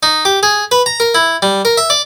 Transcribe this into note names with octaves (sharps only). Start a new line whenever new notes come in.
D#4
G4
G#4
B4
A#5
A#4
E4
G3
A#4
E5
D5